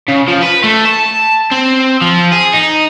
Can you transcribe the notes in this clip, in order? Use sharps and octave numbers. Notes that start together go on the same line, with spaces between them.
C#3
F3
B4
A3
A5
C4
F3
G#4
D#4